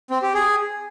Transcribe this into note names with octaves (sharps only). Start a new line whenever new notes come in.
C4
G4
G#4